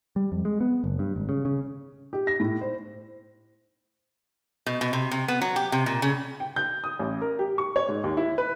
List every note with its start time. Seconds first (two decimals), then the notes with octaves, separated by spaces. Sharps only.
0.16 G3
0.32 F2
0.45 G#3
0.61 B3
0.84 F#1
0.99 G2
1.16 G#1
1.29 C#3
1.45 C#3
2.13 G4
2.27 A#6
2.40 A2
2.61 C5
4.66 B2
4.81 B2
4.93 C3
5.11 C3
5.28 B3
5.42 F#3
5.56 G4
5.72 C3
5.86 A#2
6.02 C#3
6.40 G5
6.56 G6
6.84 D#6
6.99 A1
7.21 A#4
7.39 G4
7.58 C#6
7.76 C#5
7.89 G#2
8.04 D#2
8.17 E4
8.38 B4